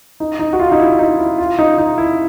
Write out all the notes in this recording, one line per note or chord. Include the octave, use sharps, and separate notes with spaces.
D#4
D#4
F#4
F4
D#4
E4
D#4
E4
F4
D#4
D#4
E4